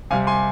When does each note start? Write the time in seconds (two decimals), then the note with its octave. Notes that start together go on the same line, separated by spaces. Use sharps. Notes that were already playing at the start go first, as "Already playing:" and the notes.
0.11 C3 G3 F5 G#5
0.27 G#5 C6